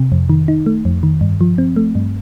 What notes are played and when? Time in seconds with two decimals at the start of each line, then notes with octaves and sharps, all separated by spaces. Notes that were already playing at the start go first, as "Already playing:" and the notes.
Already playing: C3
0.12 F2
0.30 D#3
0.48 D#4
0.66 A3
0.85 F2
1.03 D#3
1.21 G2
1.41 F3
1.58 C4
1.76 A3
1.95 G2